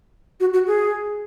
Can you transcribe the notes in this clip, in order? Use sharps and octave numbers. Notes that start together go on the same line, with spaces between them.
F#4
F#4
G#4